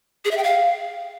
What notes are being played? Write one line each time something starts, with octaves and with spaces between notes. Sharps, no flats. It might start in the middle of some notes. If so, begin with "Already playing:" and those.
G#4
E5
G5
F5